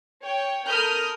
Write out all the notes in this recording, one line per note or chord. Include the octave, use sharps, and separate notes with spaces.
C#5 G5
A4 A#4 B5 D#6 F6 G6